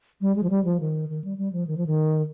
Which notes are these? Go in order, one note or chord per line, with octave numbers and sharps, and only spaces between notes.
G3
G#3
F3
G3
F3
D#3
D#3
G3
G3
F3
D#3
F3
D#3